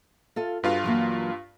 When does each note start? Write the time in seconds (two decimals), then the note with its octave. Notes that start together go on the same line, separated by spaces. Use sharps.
0.36 F4 A4 F5
0.63 G2 F4 F#4 G#4 B4 F5
0.84 E3 F#3 A#3